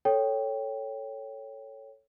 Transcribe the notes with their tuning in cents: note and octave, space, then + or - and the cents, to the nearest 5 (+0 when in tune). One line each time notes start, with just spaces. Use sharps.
A4 +0 C#5 +0 G5 +0